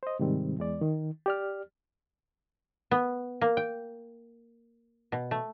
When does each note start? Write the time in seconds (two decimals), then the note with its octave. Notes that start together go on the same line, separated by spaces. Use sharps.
0.03 C5 D#5
0.19 G#2 C3 D#3 G3 C4
0.58 E2 G#3 D5
0.81 D#3
1.26 G4 D5 F6
2.91 B3
3.41 A#3
3.57 G5
5.12 B2
5.31 A3